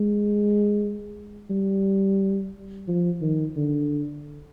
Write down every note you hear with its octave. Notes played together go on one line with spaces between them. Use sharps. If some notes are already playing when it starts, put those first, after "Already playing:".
Already playing: G#3
G3
F3
D#3
D3